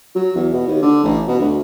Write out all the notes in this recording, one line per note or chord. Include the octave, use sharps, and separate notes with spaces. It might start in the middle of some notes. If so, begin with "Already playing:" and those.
F#3
E2
B2
D#2
D3
A1
B2
D2